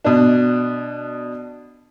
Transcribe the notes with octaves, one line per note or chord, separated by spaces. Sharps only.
B2 D4